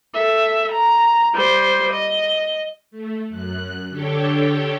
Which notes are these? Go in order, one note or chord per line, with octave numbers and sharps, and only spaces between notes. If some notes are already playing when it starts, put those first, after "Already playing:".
A4 E5
A#5
G3 C5
D#5
A3
F#2 F#6
D3 D4 G4 A4 C#5 G5